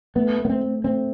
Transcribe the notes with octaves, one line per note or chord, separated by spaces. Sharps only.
A3 B3
A3
B3
C4
A3
A3 C4